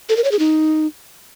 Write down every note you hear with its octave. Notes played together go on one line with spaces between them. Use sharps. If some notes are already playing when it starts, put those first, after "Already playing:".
A4
A#4
C#5
G#4
D#4